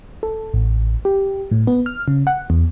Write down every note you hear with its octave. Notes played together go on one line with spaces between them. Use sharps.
A4
A1
G4
A2
B3
F6
C#3
F#5
E2